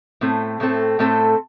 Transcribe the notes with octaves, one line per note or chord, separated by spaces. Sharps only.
A2 A3 C4 A4
A2 A3 C4 A4
A2 A3 C4 A4